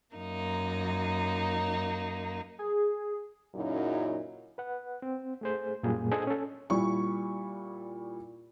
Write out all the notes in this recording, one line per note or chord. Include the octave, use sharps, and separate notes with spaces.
F#2 A#3 D#4
G#4
F#2 A#2 C#3 F#3 D#4 E4
B4 F#5
C4
A3 G#4 C5
F#2 A#2 G3 A#3 G#4
D4 G#4 A4 C5 D#5
C#4 A4
A#2 G3 E4 C#6